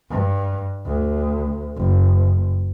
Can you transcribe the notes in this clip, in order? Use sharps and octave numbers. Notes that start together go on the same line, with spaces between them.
G2
D2
F#1